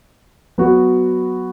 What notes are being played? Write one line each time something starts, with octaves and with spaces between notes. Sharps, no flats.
F#3 B3 F#4